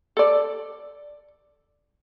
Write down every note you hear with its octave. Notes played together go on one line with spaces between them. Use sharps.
A4 D5